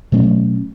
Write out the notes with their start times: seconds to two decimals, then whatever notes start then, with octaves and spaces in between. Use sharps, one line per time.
0.12 B2 F#3 A3 C#4